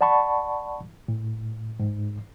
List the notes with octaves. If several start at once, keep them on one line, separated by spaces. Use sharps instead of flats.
D5 F#5 A5 B5 C#6
A2
G#2